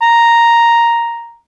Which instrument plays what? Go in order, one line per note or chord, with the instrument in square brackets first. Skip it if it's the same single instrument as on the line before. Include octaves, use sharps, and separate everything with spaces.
[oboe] A#5